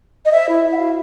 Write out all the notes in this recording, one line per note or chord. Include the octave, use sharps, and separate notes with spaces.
D#5
C5 E5
E4
E4
F#5
F#4 F5